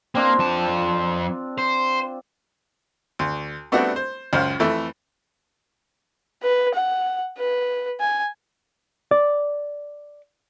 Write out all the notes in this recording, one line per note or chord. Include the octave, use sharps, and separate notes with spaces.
A#3 C4 D4 F4
F2 A5
C5
D2
G3 A3 B3 C4 D4 F#4
C5
C#2 F#2 C5 F5
F2 E3 A3
B4
F#5
B4
G#5
D5